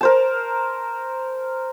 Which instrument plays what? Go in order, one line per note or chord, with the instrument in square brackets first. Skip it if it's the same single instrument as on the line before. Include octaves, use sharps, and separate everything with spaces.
[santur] A#4 C5 A5